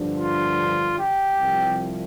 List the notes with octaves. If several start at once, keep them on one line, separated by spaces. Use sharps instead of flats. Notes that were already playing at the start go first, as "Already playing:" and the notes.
Already playing: G2 D3 F3
F4
G4
C2 C3 F3